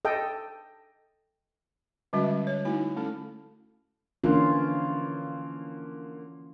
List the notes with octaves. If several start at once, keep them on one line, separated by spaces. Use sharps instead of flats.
A4 D#5 G5
D3 G3 G#3 C#4 F#4 E5
C#5
A3 D#4 E4 F#4 G#5
A3 C#4 E4 A4
D3 E3 A#3 C#4 F4